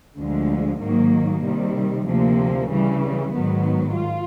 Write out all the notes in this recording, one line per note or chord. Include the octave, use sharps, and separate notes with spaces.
D2 D3 F3 G#3
G#2 D#3 F#3 A#3
C3 D#3 G3
D2 C3 F3 A#3
C#3 E3 G3
G#2 D#3 F#3 B3
F4